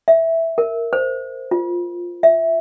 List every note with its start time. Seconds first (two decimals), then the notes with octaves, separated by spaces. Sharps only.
0.08 E5
0.58 A#4
0.93 C5
1.51 F4
2.23 E5